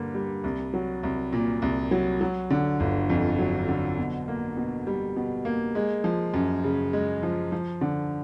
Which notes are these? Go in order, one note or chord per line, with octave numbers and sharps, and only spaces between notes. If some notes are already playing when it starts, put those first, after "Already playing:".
Already playing: G2 D3 A#3
G3
C2
F#3
C2
A#2
C2
F#3
F#3
D3
G1
F2
F#3
D3
B2
A#3
B2
G3
B2
A#3
G#3
F3
F#2
C#3
G#3
F3
F3
D3